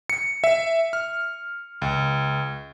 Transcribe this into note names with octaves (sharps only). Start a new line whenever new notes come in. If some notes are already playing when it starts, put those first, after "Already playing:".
C#7
E5
F6
C#2